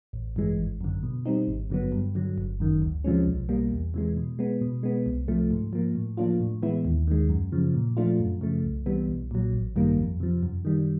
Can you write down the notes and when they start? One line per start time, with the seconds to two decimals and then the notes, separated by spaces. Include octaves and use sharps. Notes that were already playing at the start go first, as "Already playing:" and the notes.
0.13 A1
0.36 G2 E3 G#3
0.59 G#1
0.81 F#2 D3
1.03 B2
1.26 G3 C4 D#4
1.47 G#1
1.70 G2 D3 F#3 B3
1.92 G2
2.15 D3 F#3
2.38 G1
2.60 F#2 D#3
2.82 D2
3.04 C3 F3 G#3 C#4
3.27 B1
3.49 B2 G3 A#3
3.72 E2
3.94 C3 E3 G#3
4.17 B2
4.39 G#3 B3
4.61 B2
4.83 G#3 B3
5.06 C2
5.28 C3 F3 A3
5.51 G#2
5.73 F3 A#3
5.95 A2
6.17 F3 A#3 D4 F4
6.40 A2
6.63 E3 G#3 B3 E4
6.85 D#2
7.08 D#3 G#3
7.29 F#2
7.52 C#3 F3
7.74 A#2
7.97 F3 A3 D4 F4
8.20 F#2
8.41 C#3 F3 A3
8.64 C2
8.86 C3 E3 G3 B3
9.09 B1
9.31 A#2 F#3
9.53 A1
9.76 G2 D#3 G3 A#3
9.98 F2
10.20 C3 F3
10.43 F#2
10.65 D#3 G3